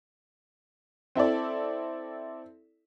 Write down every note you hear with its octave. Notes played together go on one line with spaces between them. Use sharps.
C4 E4 A4 D5